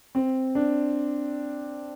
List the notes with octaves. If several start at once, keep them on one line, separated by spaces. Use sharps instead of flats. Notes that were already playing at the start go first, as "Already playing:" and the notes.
C4
D4